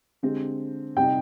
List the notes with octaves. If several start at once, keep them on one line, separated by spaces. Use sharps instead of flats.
D3 G#3 C4 G4
C3 G3 C4 D#4 G5